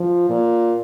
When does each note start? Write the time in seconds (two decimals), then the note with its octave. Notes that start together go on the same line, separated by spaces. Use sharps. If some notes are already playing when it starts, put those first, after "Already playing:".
Already playing: F3
0.30 A#2